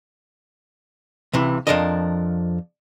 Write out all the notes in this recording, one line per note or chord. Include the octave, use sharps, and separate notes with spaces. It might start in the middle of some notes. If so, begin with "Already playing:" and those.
C#2 C3 E3
F2 B2 F3 D4 A#4 D#5